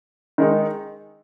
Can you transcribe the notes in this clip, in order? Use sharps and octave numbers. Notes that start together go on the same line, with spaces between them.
D#3 G#3 D#4